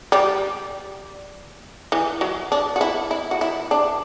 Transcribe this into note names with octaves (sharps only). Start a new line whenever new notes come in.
G3
E3
F#3
D4
F#4
E4
E4
F#4
E4
D4